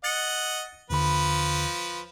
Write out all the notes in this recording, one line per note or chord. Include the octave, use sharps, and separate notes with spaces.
D#5 F#5 A6 C#7
D#2 D3 F3 B4 B5